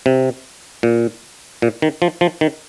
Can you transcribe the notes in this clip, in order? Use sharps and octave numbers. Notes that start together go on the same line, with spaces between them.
C3
A#2
A#2
D#3
F3
F3
D#3